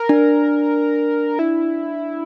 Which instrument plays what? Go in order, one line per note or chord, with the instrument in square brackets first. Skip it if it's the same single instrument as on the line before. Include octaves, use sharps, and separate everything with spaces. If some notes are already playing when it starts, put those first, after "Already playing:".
Already playing: [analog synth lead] A#4
[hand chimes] D4
[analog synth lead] E4